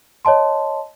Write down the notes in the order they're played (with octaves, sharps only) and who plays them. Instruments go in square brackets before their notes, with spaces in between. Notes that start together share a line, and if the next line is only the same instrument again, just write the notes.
[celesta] C#5 D#5 A5 C6